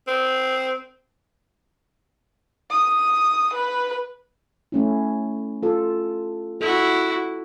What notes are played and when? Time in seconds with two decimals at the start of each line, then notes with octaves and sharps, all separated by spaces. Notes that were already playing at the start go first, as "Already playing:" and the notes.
0.08 C4
2.71 D#6
3.54 B4
4.72 A3 C#4 E4
5.63 F4 A4
6.61 E4 F#4 A4